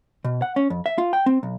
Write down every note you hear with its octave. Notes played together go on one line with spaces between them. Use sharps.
B2
F#5
C#4
F2
E5
F4
G5
C4
B1